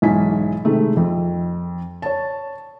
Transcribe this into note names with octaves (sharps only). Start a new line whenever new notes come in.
B1 G#2 E3 G#5 B6
C3 D#3 G#3 A3
F2
C#5 A5